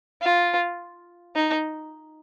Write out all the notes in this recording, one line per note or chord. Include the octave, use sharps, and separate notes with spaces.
F4
D#4